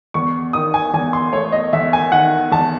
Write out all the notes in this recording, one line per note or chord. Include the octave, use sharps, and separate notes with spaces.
E2 C#6
D#3 D#6
G#5
E2 G#5
C6
A3 C#5
D#5
E2 E5
G#5
D#3 F#5
E2 A5